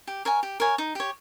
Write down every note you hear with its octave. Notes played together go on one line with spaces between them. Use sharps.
G4
A#4 C#5 G#5
G4
A#4 C#5 G#5
D#4
G4 C#5